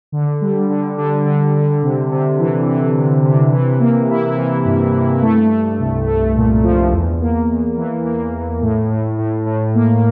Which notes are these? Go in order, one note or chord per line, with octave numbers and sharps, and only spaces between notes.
D3
G3
D3
D3
D3
D3
C3
C3
E3
E3
C3
C3
E3
A#3
E4
E3
G2
G2
A3
A3
C2
A3
A#2
F3
E2
A#3
E2
E3
A#3
E3
A2
A2
A2
A2
A#3